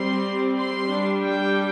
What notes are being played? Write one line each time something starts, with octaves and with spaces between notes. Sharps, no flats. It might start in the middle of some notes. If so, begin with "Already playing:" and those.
Already playing: G3 C4 C6
C6
G3 D4
G5